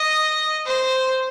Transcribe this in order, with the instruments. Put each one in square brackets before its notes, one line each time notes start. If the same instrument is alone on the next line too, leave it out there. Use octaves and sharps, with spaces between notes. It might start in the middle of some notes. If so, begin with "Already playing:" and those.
Already playing: [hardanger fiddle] D#5
C5